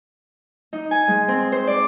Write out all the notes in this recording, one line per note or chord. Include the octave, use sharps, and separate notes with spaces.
D#4
G#5
G#3
C4
C5
D5